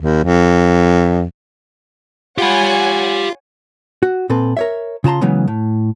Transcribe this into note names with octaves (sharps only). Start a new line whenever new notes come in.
D#2
F2
F4 G4 C#5 F#5 G#5 B5
F#4
A#2 C4 A4 B4
A#4 C#5 E5
C#3 F4 A5 A#5 C6
C#3 E3 F#3 G#3 B3 C#4
A2